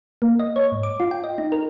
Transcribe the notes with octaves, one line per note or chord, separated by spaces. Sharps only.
A#3
D#5
C#5
G#2
D6
F4
G5
D#5
D#4
A#4